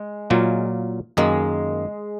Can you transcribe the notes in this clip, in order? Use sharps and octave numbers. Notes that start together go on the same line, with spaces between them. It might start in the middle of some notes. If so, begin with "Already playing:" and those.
Already playing: G#3
A#2 F#3 A#3 F4
F#2 D#3 G#3 A#3